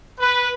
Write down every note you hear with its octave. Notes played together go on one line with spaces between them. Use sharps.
B4